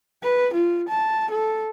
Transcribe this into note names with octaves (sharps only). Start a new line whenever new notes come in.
B4
F4
A5
A4